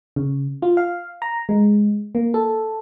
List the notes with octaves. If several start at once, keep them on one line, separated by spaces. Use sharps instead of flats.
C#3
F4
F5
A#5
G#3
A#3
A4